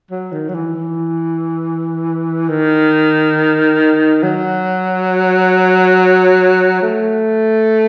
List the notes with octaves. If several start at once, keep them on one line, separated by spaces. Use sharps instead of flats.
F#3
D#3
F#3
E3
E3
D#3
F#3
A3